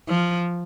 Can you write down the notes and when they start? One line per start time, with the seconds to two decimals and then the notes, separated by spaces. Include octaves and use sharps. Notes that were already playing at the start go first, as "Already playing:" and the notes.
0.08 F3